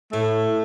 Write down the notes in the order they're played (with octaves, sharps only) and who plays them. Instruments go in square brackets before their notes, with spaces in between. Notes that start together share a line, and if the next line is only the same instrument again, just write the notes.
[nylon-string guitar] A2 [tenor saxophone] A3